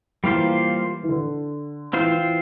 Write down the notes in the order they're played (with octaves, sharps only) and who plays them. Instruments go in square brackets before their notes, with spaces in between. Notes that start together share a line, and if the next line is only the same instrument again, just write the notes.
[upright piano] E3 [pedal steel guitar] G3 A#3 F4 C5
[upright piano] E3
D3
[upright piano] E3 [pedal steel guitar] C4 F4 C5
[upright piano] E3